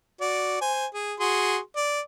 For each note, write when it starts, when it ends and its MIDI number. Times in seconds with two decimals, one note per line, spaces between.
0.21 0.57 66
0.21 0.57 74
0.61 0.86 72
0.61 0.86 80
0.94 1.15 68
1.20 1.58 66
1.20 1.58 68
1.20 1.58 84
1.76 2.01 74